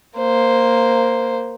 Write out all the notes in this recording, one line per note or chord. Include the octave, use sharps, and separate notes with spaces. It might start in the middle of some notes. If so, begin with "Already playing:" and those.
A#3 C5